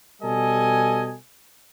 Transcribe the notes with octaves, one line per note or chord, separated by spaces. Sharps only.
B2 G3 A4 D#5 G#5